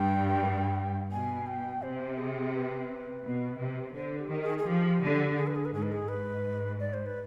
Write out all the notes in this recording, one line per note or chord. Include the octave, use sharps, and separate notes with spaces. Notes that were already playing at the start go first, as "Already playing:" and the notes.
Already playing: G2 G5
B2 G#5
G5
C3 C5
G#4
B4
B2
C3
D3 C5
G4
D#3
G#4
G#4
F3 G4
D3
G#4
B4
G#4
B4
G#2 G#4
B4
G#4
G#2 B4
D5
C5
B4